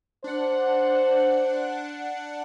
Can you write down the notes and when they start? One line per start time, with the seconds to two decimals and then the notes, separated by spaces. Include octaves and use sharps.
0.24 D4 C5 F#5